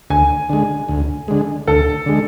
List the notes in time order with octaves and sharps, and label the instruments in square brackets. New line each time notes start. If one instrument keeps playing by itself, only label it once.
[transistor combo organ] D2 [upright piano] G#5
[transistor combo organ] D3 G#3
D2
D3 G#3
[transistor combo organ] D2 [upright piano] A4
[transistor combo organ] D3 G#3